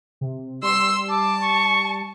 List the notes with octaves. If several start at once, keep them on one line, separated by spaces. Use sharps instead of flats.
C3
G3 C6 E6
A5 D6
C#6